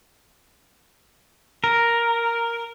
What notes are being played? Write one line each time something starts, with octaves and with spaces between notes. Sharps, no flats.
A#4